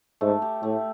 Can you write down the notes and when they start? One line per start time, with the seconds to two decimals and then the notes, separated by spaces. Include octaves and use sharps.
0.21 G#2 A3
0.42 G4
0.63 A2 A3